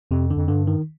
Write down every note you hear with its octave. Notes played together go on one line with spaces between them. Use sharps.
F2 C3
D3
F2
G2 D3
D#3